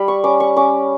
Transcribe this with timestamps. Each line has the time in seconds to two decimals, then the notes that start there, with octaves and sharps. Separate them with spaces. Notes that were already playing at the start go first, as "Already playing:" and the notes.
Already playing: G3 B5
0.08 C#6
0.24 C#4 D6
0.40 C#6
0.56 C#4 D6